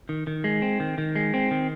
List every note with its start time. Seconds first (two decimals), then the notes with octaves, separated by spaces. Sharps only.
0.09 D#3
0.27 D#3
0.44 G#3
0.62 C4
0.80 D#3
0.98 D#3
1.16 G#3
1.34 C4
1.51 D#3